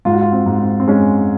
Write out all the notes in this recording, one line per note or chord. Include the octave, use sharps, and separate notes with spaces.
G#2 F4
F#4
F4
C4
G#2
C4
C4
G#3 C#4